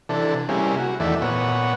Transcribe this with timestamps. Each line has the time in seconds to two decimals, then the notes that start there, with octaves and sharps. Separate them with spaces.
0.09 C3 E3 D4 A4
0.49 C3 G3 A#3 C#4 E4 G#4
0.79 F#4
1.00 E2 D#3 E3 A3 D5 E5
1.22 A#2 B3 C#5 F#5